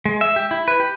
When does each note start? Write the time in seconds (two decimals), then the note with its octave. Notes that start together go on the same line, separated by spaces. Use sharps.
0.06 G#3
0.21 E5
0.36 G4
0.51 E4
0.68 B4
0.80 G4